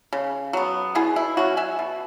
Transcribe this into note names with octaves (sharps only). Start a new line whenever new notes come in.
C#3
F#3 B3
B2 E4 G#4
E4
F#3 C#4 F#4
E5 G#5
B2